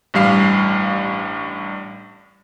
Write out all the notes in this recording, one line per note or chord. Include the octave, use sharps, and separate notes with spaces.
A1 G2 G3 F5 C7